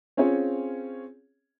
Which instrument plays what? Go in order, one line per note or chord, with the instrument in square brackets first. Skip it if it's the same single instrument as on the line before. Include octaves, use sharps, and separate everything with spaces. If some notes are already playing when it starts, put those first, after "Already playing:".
[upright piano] C4 C#4 F4 G#4 C#5